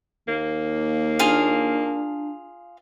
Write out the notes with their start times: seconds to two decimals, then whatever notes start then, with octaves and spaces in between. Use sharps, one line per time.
0.28 D#2 A#3
1.19 D4 F4 G#4 F5